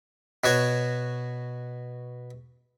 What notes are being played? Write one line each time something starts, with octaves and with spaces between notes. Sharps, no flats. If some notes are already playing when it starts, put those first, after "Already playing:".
B2 F#4 C#5